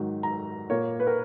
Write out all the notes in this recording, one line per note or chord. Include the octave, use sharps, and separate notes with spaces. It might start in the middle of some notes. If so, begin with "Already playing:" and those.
Already playing: G#2 D#3 F#3
A#5
A#2 A#3 C#5
B4
A#4